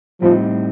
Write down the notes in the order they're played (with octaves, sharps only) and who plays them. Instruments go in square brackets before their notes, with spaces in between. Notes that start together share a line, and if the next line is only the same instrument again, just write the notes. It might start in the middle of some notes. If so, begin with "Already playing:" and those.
[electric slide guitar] A2 G3 C4 D#4 [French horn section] F3